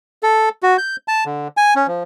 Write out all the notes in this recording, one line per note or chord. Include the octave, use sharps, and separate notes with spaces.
A4
F#4
G6
A5
D3
G#5
C#4
F3